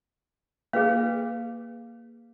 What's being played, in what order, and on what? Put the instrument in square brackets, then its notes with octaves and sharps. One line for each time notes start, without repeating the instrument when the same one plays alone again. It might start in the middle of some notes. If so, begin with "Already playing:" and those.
[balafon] A#3 [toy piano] G#4 B4 F5